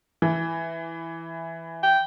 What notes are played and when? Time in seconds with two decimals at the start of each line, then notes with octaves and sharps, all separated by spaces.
0.22 E3
1.83 G5